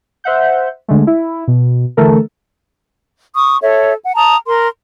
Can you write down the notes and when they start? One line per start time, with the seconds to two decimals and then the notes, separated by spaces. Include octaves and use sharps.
0.24 C5 E5 F#5 G6
0.88 D3 G#3 A3
1.07 E4
1.48 B2
1.97 D3 E3 A3 A4 A#4
3.35 C#6 D#6
3.61 A4 C#5 E5
4.03 F#5
4.15 A5 A#5 D#6
4.46 A#4 C6